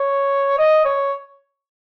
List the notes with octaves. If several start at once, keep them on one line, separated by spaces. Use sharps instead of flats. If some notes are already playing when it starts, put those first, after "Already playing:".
Already playing: C#5
D#5
C#5